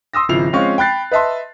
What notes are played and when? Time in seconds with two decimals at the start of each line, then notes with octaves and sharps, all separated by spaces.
0.14 C6 D#6 E6 A#6
0.29 G#1 C#3 F3 E4 C7 F7
0.53 F3 G#3 C4 C#4 F5 C#6
0.78 G5 B5 F#6 A6 C7
1.11 B4 D#5 E5 A5 C6